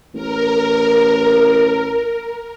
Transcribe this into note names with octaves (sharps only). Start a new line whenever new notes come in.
A1 A#4